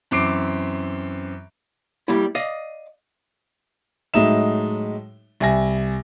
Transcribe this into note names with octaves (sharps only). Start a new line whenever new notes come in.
F#2 E3 C4 D6 C7 D7
G3 A#3 E4
D5 D#5 F5
A2 F#3 G#3 D#4 E5 E7
C2 E5 G#5 A#6